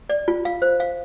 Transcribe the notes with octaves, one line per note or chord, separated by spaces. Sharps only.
D5
F4
F5
C5
F5